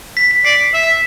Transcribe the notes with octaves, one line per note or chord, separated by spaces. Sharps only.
B6
B6
D5 C7
B6
C7
E5
B6